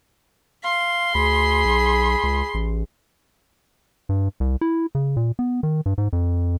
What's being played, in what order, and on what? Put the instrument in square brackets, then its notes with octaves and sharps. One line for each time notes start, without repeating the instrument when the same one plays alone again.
[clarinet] F5 [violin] C6
[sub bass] D2 [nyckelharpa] G#4 [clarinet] B5
[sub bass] B1
C#2
A1
[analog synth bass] G2
C2
E4
C#3
A#2
B3
D#3
G2
G#2
F2